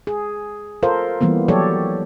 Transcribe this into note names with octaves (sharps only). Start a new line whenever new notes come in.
G#4
F4 A4 A#4 C5 F5
E3 G3 A#3 B3
F3 F#3 G4 A4 C#5 D5